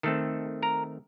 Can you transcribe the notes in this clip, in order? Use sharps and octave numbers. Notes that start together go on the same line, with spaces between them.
D#3 A3 C4 A4 A5
A#4 A#5